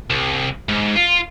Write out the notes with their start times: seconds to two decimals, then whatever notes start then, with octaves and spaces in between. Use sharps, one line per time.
0.10 C2
0.69 G#2
0.96 F4